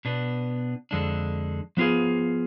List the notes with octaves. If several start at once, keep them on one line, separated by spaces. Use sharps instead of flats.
B2 B3 D4
F2 D3 G#3 D4
F3 B3 F4 G#4